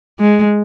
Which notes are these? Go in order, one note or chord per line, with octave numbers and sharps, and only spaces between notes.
G#3